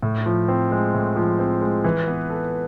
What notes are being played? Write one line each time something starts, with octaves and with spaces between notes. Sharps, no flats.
A2
F3
C4
G#3
A2
F3
C4
G#3
E3
B3
A4